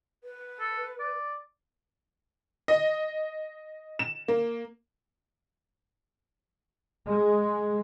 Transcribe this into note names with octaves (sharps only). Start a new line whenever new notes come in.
B4
A4
D5
D#5
E7
A#3
G#3